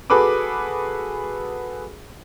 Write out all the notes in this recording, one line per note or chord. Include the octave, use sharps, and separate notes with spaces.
F#4 G#4 A4 B4 B5 D6